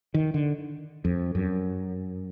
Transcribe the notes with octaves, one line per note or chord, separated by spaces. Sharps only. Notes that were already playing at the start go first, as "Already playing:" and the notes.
D#3
D3
F2
F#2